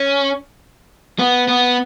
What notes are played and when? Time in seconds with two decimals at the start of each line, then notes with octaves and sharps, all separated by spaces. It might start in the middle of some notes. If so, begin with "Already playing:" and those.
Already playing: C#4
1.19 B3
1.48 B3